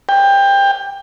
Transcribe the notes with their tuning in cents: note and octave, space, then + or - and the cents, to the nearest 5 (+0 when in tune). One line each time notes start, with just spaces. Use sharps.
G5 +20